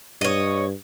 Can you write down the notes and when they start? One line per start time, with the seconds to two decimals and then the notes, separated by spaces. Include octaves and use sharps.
0.21 G2 C#5 D#5